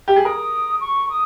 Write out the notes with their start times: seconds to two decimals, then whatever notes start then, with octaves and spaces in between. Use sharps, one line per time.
0.08 G4
0.16 G#4
0.25 A#4 D#6
0.81 C#6
1.10 D#6